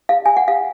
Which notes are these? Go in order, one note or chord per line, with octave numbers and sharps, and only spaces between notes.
F5
G#5
F#5
F5